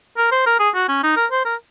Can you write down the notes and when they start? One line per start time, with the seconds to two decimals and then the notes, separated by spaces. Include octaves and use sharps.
0.17 A#4
0.31 C5
0.46 A#4
0.60 G#4
0.75 F#4
0.89 C#4
1.03 D#4
1.17 A#4
1.31 C5
1.45 A#4